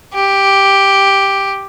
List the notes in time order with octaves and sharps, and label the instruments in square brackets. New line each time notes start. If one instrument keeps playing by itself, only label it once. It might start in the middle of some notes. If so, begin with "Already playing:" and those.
[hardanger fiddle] G4